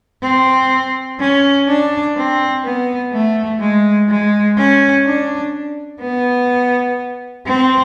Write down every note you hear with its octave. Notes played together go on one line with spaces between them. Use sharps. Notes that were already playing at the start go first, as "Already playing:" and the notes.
C4
C#4
D4
C4
B3
A3
G#3
G#3
C#4
D4
B3
C4